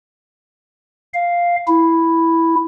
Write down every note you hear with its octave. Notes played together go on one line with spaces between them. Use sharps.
F5
E4